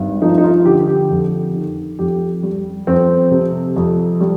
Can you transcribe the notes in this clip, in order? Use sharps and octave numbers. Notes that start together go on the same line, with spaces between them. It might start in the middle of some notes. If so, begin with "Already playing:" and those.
Already playing: G#1 G2
F3 D#4
D#4
F4
D3 G4
G4
F2
D#3
F2 G4
G3
F2 C4
C3
F2
G3